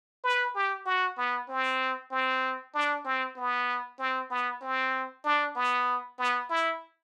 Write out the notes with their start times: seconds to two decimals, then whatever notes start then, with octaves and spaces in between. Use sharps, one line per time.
0.24 B4
0.55 G4
0.86 F#4
1.17 B3
1.49 C4
2.11 C4
2.75 D4
3.05 C4
3.36 B3
3.99 C4
4.31 B3
4.61 C4
5.24 D4
5.56 B3
6.18 B3
6.50 E4